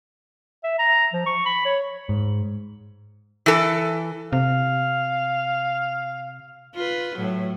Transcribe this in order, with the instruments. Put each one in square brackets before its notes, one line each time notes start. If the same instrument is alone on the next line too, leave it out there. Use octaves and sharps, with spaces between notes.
[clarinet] E5
A#5
F3
C#6
B5
C#5
[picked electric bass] G#2
[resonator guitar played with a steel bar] E3 A4
[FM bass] C3 [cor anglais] F5
[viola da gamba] F4 B4
A2 F#3